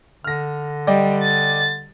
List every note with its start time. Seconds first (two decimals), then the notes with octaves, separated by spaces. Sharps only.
0.24 D3 F6 A#6
0.87 G3 D5 D#5 G5
1.22 A6